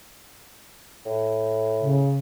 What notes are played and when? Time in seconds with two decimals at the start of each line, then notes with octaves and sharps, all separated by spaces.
1.06 A2
1.81 C#3